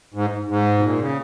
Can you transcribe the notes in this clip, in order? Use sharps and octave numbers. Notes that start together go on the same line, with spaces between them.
G#2
G#2
B2
A#2
C#3